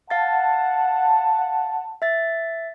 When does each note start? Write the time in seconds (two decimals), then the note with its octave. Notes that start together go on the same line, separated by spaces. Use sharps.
0.10 F5 F#5 A5 A6
2.02 E5 A6